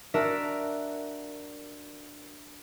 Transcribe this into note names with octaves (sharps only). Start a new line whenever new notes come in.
D4 F#4 A#4 E5